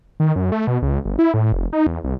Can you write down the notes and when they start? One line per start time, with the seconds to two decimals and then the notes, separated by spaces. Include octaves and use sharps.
0.20 D#3
0.36 F#2
0.52 A3
0.67 B2
0.82 C#2
1.05 G1
1.19 E4
1.34 A2
1.52 F1
1.73 D#4
1.87 E2
2.04 C2